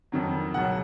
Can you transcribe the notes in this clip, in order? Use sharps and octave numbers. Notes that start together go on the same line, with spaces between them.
F2 D#3 F#3
C#2 B2 F#3 F#5